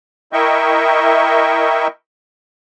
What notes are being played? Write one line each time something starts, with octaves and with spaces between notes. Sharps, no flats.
E4 A#4 D#5 E5 G5 C#6